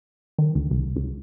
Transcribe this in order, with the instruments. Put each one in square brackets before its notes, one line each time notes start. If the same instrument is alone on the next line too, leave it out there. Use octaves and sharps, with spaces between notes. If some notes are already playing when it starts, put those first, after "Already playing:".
[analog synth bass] D#3
D2
C2
C#2